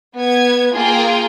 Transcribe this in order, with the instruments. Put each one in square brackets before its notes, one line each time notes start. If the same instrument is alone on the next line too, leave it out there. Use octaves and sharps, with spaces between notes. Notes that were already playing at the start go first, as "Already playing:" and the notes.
[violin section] B3 G#6
A#3 F4 G#4 G5